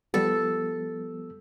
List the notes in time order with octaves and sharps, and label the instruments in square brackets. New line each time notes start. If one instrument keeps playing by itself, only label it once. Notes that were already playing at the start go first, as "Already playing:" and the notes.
[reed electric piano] F3 G3 B3 [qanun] A4